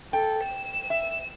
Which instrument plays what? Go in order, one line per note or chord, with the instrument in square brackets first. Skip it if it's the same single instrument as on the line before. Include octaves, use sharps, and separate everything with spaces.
[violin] A4 [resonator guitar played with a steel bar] G5
[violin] E7
[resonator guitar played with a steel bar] E5